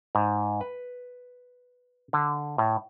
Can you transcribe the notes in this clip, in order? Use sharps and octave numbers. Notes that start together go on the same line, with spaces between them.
G#2
B4
D3
A2